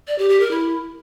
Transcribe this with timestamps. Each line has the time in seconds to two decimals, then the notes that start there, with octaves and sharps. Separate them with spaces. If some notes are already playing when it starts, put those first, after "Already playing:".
0.08 D5
0.18 G4
0.29 G4
0.40 A#4
0.51 E4